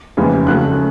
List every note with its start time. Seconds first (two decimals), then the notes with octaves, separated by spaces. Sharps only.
0.17 F1 D#2 C#3 E3
0.47 C#2 C#3 F#3 A3 F#6